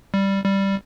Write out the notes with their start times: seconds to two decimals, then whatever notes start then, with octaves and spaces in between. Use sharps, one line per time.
0.14 G3
0.44 G3